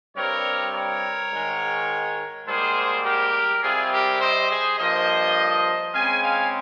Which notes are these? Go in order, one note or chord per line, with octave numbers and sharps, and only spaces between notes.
G2 G3 C4 A#4 C#5
A#4 C#5
G#2 D#3 G#3
G#2 G3 A#3 G#4 C5
G4 A#4
C3 G3 C4 F4 G#4
G4 A#4
C5 D#5
G#4 C5
G2 F3 A#3 C5 D#5
C#3 G#3 C4 F5 G#5
F5 G#5